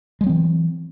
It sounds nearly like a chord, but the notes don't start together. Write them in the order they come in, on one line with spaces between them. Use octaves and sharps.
G#3 F#3 C4 E3